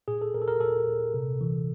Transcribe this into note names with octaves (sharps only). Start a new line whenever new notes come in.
A#2 G#4
A4
A#2 A#4
A4
A#4
A#2 A4
A#2
C3
E3